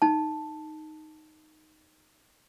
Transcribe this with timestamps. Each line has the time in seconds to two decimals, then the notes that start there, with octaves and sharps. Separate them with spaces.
0.02 D#4 A5